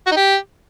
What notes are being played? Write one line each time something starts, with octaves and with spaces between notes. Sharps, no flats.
F#4
D#4
G4